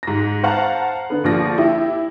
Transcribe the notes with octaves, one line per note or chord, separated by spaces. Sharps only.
G#2 A#6
C5 F5 F#5 A5 A#5
D3 B3
A#1 D3 F3 A#6
E4 G4